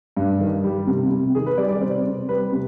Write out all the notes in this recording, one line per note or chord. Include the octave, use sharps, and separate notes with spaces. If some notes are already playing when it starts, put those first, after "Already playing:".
G2
D#3
G3
C3
C3
D#3 G#4
B4
G3 D5
D5
C3 C5
C3
G3 B4
C3